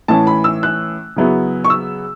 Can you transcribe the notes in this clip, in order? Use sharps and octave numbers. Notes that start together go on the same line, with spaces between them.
A2 E3 C#4 A5
B5
E6
F#6
C#3 F#3 B3 E4
C#6
E6